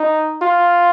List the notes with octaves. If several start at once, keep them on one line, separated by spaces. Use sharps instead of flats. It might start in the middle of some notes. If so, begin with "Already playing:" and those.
Already playing: D#4
F4